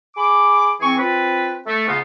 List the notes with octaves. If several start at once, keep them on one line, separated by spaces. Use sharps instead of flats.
G#4 B5 D6
E3 C4 G#4 C#6
C4 F4 B4
A3
G#2 C#3 B3 D#4 F4